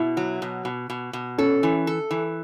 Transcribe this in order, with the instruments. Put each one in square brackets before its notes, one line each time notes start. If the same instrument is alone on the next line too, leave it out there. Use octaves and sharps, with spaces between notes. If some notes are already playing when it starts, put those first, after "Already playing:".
Already playing: [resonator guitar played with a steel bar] B2 [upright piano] E4
[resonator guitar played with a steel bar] F#3
B2
B2
B2
B2
[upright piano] C#4 [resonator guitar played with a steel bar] A4
[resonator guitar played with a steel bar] E3
A4
E3